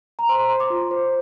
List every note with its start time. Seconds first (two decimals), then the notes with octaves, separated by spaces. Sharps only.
0.19 A#5
0.29 C5 C6
0.39 A#5
0.49 C5 C6
0.60 D6
0.70 F4
0.91 C5